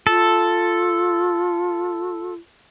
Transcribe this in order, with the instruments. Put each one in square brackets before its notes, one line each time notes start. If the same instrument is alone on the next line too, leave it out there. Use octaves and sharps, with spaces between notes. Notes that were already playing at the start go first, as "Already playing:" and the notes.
[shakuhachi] F4 [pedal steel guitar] A4